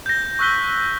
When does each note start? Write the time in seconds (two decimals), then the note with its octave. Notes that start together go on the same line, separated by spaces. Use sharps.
0.06 G6 A#6
0.39 C#6 E6 F#6 B6 G7